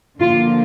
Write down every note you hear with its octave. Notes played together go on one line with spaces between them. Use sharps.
D3 F3 A#3 D4 F4